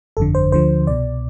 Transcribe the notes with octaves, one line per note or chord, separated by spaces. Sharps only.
G1 F2 D3 A4
C5
D2 D3 F3 C5
C2 B2 D5